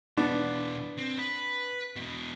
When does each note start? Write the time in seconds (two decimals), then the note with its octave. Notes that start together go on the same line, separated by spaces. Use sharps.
0.17 B2 E3 B3 D4
0.98 C4
1.18 B4
1.96 E2 B2